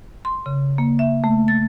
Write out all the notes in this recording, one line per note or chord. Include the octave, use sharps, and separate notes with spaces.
C6
C#3
A#3
E5
A3
A6